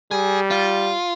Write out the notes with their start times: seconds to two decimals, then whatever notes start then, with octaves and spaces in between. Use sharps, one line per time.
0.11 G3 G#4
0.51 F4